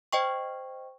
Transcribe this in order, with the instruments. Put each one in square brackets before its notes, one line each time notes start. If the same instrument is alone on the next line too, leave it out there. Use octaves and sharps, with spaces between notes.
[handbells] C5 D#5 G5 C#6